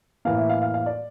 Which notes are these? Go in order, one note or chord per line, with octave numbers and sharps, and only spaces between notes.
A2 E3 A#3 F5
E5
F5
F5
F5
D5